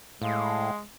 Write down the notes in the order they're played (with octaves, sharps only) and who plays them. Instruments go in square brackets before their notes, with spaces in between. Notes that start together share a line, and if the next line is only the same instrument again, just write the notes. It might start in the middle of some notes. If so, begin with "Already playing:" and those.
[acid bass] A2 [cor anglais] G#3 [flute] F5